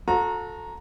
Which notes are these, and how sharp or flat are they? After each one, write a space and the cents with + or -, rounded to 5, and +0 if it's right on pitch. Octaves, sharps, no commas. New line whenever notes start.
F#4 -40 A4 +0 A#5 +0